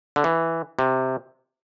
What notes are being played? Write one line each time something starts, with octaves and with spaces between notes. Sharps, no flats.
D3
E3
C3